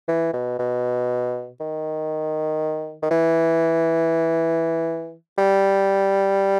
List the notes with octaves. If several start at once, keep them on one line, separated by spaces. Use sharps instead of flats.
E3
B2
B2
D#3
D#3
E3
G3